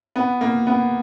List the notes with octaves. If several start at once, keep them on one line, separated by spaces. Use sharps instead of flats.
B3
A#3
B3